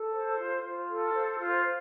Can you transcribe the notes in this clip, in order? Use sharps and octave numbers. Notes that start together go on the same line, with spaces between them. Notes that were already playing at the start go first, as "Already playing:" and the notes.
Already playing: A4
C5
F4
F4
A4
C5
F4